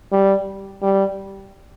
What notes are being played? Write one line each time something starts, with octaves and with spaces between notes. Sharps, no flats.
G3
G3